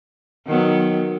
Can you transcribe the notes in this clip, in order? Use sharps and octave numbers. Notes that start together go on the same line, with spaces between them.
D#3 F#3 B3